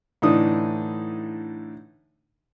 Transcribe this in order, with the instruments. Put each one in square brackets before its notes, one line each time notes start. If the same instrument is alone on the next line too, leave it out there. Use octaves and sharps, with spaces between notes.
[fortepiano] A2 D3 E3 D4 D#4 D#6